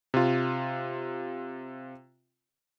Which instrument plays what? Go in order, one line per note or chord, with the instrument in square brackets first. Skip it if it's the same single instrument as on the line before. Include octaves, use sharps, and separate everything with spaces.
[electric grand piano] C3 F4